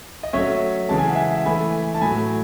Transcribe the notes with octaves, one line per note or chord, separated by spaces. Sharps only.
D#5
F#3 A3 C#4 C#5 E5
C#3 E3 G#3 A5
G#5
F#5
E5 G#5
E3 A3 E4 G#5 B5
A5
A2 F#3 A3 G#5 B5